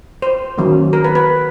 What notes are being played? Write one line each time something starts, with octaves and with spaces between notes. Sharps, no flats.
C5
D#3 F#3 A#3 C#4
A#4
B4
B4